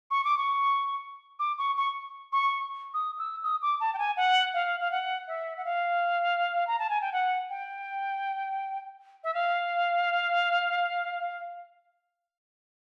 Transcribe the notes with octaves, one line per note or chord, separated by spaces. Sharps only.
C#6
D6
C#6
D6
C#6
C#6
C#6
D#6
E6
D#6
D6
A5
G5
G#5
F#5
F5
F5
F#5
E5
F#5
F5
A#5
A5
G#5
G5
F#5
G5
E5
F5